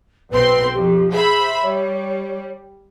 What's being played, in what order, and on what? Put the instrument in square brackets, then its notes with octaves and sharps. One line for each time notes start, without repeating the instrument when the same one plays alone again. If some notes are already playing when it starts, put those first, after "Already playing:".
[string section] B1 C4 C6 [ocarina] B4
[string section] F2 [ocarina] G4
[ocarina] G#4 [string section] C5 E5 B5
[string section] G3 [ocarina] C#5